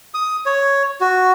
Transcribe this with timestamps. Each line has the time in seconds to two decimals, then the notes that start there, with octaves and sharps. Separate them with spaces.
0.14 D#6
0.46 C#5
1.01 F#4